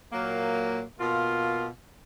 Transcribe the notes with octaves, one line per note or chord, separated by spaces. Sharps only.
A#2 F#3 A#3
B2 A#3 F4